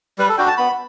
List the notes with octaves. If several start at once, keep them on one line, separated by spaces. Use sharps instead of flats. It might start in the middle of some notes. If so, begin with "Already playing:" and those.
G3 B4
A4
D4 F#4 G5
A5
B3 B5